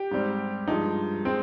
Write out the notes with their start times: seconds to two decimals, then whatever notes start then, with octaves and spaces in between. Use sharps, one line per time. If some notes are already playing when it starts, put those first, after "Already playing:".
Already playing: G4
0.11 G#2 G3 C4
0.68 G2 F3 G#3 D#4
1.25 G#3 C4